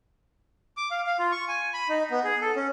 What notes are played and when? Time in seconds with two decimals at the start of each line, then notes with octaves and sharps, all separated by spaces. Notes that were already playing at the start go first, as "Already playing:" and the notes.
0.77 D6
0.91 F5
1.06 F5
1.19 F4
1.32 C#6
1.48 G#5
1.74 B5
1.89 D#4
2.11 B3
2.24 G#4
2.42 A4
2.56 C#4